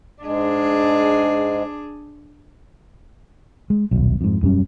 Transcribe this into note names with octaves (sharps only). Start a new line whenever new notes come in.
G#2 G#3 D4 G#4
G#3
D#1 B1
F2 G#2
E1 F#2 G3 C#4